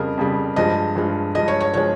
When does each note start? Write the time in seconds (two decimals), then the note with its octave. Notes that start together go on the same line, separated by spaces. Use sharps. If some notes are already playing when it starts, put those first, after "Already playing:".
Already playing: F2 C#3 G3 A#4
0.17 F2 C#3 G3
0.56 G2 F3 G#3 D#5
0.95 G2 F3 G#3
1.35 G2 F3 G#3 D#5
1.48 C#5
1.60 C#5
1.74 F3 G#3 C#5